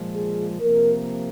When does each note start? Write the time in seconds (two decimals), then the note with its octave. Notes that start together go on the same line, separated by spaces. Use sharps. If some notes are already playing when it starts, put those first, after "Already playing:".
Already playing: A#2 F3 G#3
0.14 G#4
0.60 C3 F3 A#3 A#4